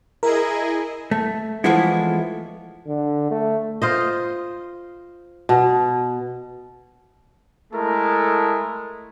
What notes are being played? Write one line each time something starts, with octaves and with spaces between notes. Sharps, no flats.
E4 G#4 A#4 D#5
A3
E3 F3 G#3 A3 B3 E4
D3
A3
F4 C5 D#5
B2
G#3 A3 E4 A4 A#4